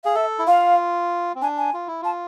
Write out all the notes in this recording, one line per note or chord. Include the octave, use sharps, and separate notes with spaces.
G#4 F5
A4 E5
E4
F4 F5
C4
D4 G#5
G#5
F4
E4
F4 A5